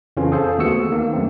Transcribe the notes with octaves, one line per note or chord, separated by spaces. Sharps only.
F2 C#3 E3 F3 C#4 F4
G#4 A4 C5 F5
D#2 A3 B3 F#4 E6 C#7
D#3 A#3
F#2 A3 C4